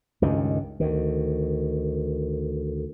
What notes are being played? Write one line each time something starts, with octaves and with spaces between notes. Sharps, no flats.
C#2 G2 D#3
D2 D#3